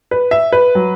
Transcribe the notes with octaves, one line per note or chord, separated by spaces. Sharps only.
B4
E5
B4
F#3